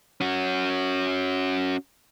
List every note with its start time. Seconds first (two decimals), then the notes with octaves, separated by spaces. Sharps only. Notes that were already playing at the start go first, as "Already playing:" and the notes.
0.21 C#4 F#4